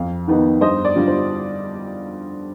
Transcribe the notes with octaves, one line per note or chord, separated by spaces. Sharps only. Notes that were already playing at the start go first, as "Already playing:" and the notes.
Already playing: F2 F5
D#3 B3 D#4
G2 C5 D#5
D5
D3 G3 D4 F4
C5